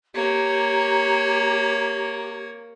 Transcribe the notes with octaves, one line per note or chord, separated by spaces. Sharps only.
A#3 G4 C#5 A#5